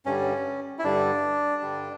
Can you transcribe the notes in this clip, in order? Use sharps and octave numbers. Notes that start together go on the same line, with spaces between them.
G2 D3 G3 C#4
E4
G2 D3 G3 D4
G2 D3 G3